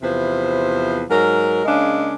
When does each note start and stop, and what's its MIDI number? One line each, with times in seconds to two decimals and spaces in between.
0.03 1.03 40
0.03 1.03 48
0.03 1.03 53
0.03 1.03 71
0.03 1.03 72
1.10 1.61 44
1.10 1.61 54
1.10 1.61 70
1.65 2.14 49
1.65 2.14 56
1.65 2.14 58
1.65 2.14 61
1.65 2.14 62